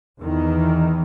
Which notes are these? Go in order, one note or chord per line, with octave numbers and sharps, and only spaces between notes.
E2 D#3 E3